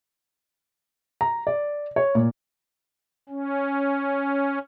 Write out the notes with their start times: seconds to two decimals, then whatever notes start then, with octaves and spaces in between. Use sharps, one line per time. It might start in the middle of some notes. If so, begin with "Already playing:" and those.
1.21 A#5
1.47 D5
1.96 C#5
2.15 A#2
3.29 C#4